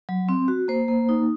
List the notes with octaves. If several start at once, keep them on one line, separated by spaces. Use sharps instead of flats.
F#3
C4
F#4
A#3 C5
A#3
D#4